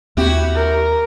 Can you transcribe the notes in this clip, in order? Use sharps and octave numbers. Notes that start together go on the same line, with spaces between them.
D#2 C4 E4 F#4 G4
A#4